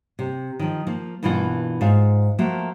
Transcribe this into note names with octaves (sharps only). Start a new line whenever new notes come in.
C3
D#3 F3
F3 A#3
G2 B2 E3 A#3 F4 F#5
G#2 F4 F5
F3 A3 A#3 F#4